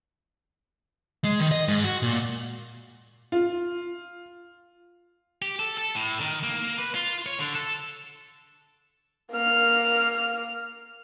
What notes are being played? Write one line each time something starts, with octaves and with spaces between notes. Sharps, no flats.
G#3
D#3
D#5
G#2
F#4
A#2
F4
G4
A4
A4
A2
D#3
A#3
B4
F4
C#5
D3
A4
A#3 F6